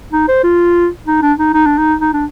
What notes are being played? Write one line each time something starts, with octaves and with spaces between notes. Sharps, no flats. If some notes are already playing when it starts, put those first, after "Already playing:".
D#4
C5
F4
D#4
D4
D#4
D#4
D4
D#4
D#4
D4